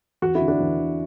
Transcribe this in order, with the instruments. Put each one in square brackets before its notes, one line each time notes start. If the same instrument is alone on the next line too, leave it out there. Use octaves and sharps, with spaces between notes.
[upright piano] E2 F#4
E4
D3
D4 F#4
E2
D3